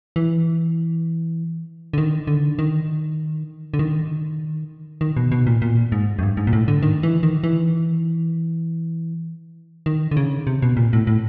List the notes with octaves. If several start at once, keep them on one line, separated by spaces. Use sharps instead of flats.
E3
D3
D#3
D3
D#3
D3
D#3
D#3
B2
B2
A#2
A#2
G#2
F#2
G2
G#2
A#2
A2
D3
D#3
E3
D#3
E3
D#3
D3
C#3
C3
B2
A#2
A2
A2